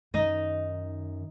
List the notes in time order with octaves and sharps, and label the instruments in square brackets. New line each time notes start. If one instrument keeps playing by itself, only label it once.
[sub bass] F#2 [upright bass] D#3 [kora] D#4 D#5